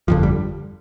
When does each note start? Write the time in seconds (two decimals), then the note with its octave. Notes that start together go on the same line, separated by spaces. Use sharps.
0.08 G1 F2 D3 F3
0.23 G3